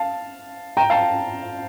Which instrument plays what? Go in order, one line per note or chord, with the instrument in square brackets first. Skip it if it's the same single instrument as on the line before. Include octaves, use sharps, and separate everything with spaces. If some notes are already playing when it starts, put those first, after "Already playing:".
Already playing: [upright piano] F5 A5
G5 A#5
F5 A5